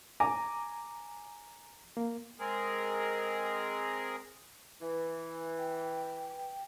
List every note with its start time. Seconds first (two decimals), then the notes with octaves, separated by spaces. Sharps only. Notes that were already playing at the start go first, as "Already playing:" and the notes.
0.20 G#5 A#5 D6
1.97 A#3
2.39 G#3 C4 G#4 A#4
4.81 E3
5.59 G5